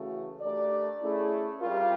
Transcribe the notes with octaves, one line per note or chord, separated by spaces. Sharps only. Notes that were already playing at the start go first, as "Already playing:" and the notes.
Already playing: C#3 E3 A3 C#4 F#4
A3 D4 G4 A#4 D5
A3 C#4 E4 G#4
G3 C4 F4 A#4